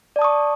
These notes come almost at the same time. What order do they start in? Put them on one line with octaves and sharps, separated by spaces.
D5 A5 D#6 C#6